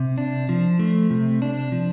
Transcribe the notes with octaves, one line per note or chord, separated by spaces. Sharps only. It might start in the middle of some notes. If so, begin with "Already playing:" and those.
Already playing: C3
D4
F3
A3
C3
D4
F3